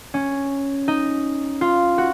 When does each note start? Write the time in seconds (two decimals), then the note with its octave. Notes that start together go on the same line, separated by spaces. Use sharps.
0.14 C#4
0.88 D#4
1.61 F4
1.98 F#4